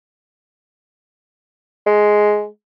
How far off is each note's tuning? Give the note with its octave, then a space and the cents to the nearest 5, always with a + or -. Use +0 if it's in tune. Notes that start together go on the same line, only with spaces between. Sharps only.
G#3 +10